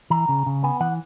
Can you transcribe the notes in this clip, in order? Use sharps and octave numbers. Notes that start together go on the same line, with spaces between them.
E3 A#5
C#3
C#3
B3 G#5
E3 F#5